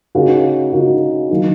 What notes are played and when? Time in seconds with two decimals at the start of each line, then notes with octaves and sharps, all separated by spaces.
0.15 C#3 A#3 D#4 F#4
0.73 C#3 A#3 D#4 F#4
1.31 D#3 F#3 A#3 D#4